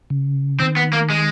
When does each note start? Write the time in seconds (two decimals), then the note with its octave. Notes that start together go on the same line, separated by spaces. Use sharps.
0.10 C#3
0.59 D#3 C4
0.77 B3
0.93 A#3
1.10 G#3